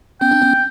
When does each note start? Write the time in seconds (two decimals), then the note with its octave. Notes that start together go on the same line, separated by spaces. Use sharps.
0.21 B3 C#4 G5
0.31 C4 D4
0.42 B3 C#4